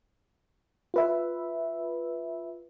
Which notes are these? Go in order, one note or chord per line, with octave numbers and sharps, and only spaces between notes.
F4 B4 E5